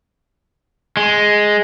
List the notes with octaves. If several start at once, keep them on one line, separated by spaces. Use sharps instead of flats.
G#3